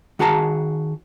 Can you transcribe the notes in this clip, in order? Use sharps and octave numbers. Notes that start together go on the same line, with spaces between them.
D#3 F#4 G#4 A5 A#5